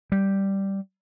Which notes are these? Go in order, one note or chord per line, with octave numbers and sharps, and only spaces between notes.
G3